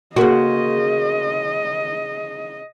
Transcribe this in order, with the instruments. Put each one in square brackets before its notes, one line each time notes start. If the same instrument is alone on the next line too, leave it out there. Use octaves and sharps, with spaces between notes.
[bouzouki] C#3 C5 [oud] A#3 F#4 [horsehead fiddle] D#5